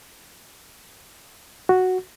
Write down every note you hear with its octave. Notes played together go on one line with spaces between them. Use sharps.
F#4